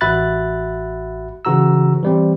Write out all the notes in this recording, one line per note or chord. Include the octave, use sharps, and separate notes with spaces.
A1 F#4 E5 B5 F#6 A6
C#3 E3 F#4 A#5 E6
E3 G3 C4